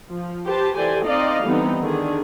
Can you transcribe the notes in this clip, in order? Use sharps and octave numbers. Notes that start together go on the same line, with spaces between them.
F3
G4 B4 C5 A5
E3 G4 A4 C5 D5 G#5
C4 D#4 D5 D#5 F5
D3 E3 G3 B3 C4 D#4
D3 D#3 D4 G#4